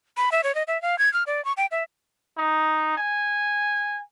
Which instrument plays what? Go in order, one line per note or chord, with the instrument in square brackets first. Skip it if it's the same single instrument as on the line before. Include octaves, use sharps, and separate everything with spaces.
[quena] B5
E5
C#5
D#5
E5
F5
G#6
F6
D5
C#6
G5
E5
[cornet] D#4
G#5